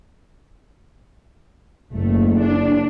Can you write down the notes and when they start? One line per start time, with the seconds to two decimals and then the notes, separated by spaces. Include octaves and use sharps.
1.93 F#1 A3
2.40 D4